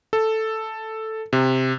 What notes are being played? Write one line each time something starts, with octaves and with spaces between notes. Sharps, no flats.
A4
C3